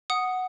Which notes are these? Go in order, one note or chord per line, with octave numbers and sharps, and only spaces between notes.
F#5 D#6